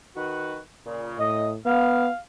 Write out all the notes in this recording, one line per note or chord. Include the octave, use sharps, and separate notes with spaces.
D#3 F#4 B4
A#2 C#3
A2 D#5
B3 F5